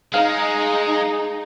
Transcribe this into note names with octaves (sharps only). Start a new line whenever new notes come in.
G#3 D#4 G#4 F5